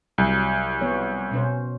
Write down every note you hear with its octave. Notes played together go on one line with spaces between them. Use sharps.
C2 F#3
F3 B3 C#5
B2 C#4 C5